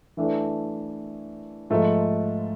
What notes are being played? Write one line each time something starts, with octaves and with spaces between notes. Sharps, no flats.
E3 A3 D4
G#2 F3 A3